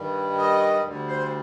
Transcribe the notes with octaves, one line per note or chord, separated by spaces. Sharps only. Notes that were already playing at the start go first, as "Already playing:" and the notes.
Already playing: G2 D#3 G3
D#5
D2 D3 G3
C5